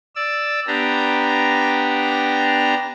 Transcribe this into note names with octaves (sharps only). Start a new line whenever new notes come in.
D5 E6
B3 D4 G4 A#5